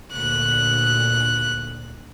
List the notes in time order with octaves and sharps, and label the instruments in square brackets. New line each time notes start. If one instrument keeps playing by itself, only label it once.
[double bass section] D2 A#2 [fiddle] F#6